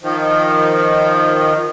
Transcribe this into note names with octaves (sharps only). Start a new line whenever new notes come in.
D#3 F3